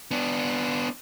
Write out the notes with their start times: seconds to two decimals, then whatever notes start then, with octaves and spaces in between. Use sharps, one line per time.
0.11 B3 D4